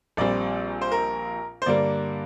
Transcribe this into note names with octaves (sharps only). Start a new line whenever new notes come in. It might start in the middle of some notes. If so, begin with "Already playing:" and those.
A#1 A#2 G3 C4 D5
C5
A#4
C5
G2 D3 G3 A#3 D5